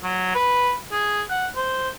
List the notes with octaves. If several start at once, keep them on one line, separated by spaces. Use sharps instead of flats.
F#3
B4
G#4
F#5
C5